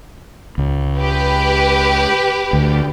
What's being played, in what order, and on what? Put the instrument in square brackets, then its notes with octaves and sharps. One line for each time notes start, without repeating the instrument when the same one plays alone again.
[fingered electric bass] C#2
[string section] G4 B4
[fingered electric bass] D2